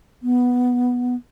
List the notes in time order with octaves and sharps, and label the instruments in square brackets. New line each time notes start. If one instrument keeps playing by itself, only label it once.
[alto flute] B3